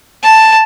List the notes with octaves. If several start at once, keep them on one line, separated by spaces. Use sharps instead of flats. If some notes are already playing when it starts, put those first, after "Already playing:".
A5